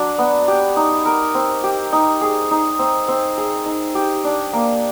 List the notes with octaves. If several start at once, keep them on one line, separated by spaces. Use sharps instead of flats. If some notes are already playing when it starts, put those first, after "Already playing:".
Already playing: F#3 D4
B3
G4
D#4
A#4
C4
G4
D#4
G#4
D#4
C4
C4
G#4
D#4
G4
D4
A#3